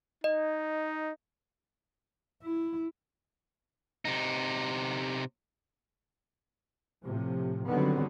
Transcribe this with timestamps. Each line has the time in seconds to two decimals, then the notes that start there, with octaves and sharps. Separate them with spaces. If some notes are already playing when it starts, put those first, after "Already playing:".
0.24 D#4 D#5
2.43 E4
4.05 C3 D#4
7.03 A2 C3 F3
7.67 D3 D#3 F#3 G3 B3 C4